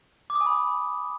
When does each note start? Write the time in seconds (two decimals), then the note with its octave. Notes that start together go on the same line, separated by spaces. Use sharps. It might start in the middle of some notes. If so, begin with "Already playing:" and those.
0.30 D6
0.35 D#6
0.41 G#5
0.46 B5